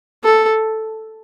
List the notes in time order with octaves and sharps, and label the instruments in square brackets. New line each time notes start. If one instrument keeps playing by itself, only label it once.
[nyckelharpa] A4